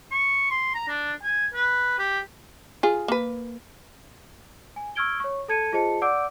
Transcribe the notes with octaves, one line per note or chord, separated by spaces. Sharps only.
C#6
C6
A#5
D4
G#5
B4
G4
F4 G#4
A#3 B4
G#5
C#6 E6 F6 G#6 D7 G7
C#5 C#6
A4 A5 G#6 C#7 D#7
F4 G#4 C5 D#5 A5 C#7
D5 F#5 D6 E6 G6 D7